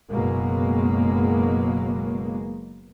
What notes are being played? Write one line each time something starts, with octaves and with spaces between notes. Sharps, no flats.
F#1 B2 F#3 G#3 A#3